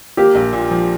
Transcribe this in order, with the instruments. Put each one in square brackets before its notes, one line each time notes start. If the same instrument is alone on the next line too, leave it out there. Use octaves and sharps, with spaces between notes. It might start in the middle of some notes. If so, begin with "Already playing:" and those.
[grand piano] A#3 [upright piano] G4
[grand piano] A#1
A#2
F3